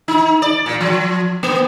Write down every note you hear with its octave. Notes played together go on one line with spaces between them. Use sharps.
D#4
D5
A#2
F3
A#3